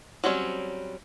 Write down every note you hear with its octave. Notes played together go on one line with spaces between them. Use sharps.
F#3 G3 C4 C#4